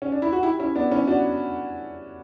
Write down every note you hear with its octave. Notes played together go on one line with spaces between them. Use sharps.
C#4
D4
E4
F#4
E4 G4
C#4 E4
B3 D4
C#4 E4
D4 F#4